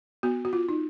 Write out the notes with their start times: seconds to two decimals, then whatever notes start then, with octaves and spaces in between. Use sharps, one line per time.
0.23 B3 F#4
0.45 F#4
0.53 F4
0.69 D#4